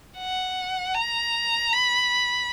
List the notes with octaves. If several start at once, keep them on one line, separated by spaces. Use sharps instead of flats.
F#5
A#5
B5